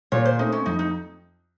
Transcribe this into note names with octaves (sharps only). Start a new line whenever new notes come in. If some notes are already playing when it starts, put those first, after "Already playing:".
A#2 C#5
C5
A3 C4 D#4
C#4
F2 D#4
D#4